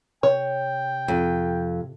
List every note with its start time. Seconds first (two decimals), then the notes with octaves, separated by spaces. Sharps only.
0.23 C3 C#5 G5
1.08 F2